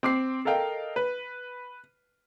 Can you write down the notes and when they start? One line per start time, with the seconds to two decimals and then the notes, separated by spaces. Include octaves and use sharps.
0.03 C4 D6 C7
0.45 A4 A#4 D#5 F5 G5
0.96 B4